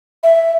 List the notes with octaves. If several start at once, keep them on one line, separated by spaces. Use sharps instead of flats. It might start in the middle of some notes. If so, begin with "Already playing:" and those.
E5